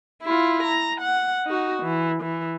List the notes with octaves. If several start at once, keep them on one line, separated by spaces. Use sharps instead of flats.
E4 F4
A#5
F#5
D#4 F#4
E3
E3